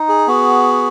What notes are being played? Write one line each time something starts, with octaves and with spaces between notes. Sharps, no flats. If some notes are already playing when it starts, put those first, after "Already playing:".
Already playing: D#4
G#4
B3 F#4